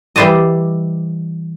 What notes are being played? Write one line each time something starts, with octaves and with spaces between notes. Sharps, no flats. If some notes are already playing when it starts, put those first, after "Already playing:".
E3 G3 C5 D5 D#5